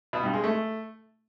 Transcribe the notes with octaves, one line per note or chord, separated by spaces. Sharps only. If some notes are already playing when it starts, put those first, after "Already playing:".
B2
G2
G#3
A3